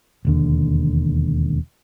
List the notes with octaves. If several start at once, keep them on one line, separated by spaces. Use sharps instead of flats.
E1 D#2 D3